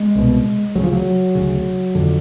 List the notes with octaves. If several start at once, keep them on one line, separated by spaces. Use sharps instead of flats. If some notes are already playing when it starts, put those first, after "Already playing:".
Already playing: G#3
C2 B2
D2 C#3 F#3
F3
F#3
D2 C#3
F2 D3